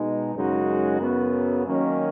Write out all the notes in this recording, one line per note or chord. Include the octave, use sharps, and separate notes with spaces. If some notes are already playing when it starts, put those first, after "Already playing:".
Already playing: B2 G#3 D#4
F#2 C#3 G#3 D#4 F#4
F#2 C#3 F#3 B3
D#3 F#3 A#3 C#4